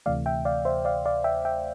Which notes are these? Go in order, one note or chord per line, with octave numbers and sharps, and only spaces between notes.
D2 C3 E3 A3 D5 F5
E5 G5
D5 F5
C5 E5
D5 F5
D5 F5
E5 G5
E5 G5